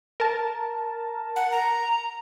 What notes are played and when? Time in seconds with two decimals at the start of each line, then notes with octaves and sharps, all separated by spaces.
0.20 A#4 A5
1.36 F#5
1.51 A#5